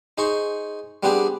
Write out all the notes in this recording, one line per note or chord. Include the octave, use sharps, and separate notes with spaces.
D#4 G#4 C5 C#6
G3 B3 C4 D4 G4 G#4